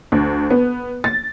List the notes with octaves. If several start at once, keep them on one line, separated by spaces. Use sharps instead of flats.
D2
B3
A6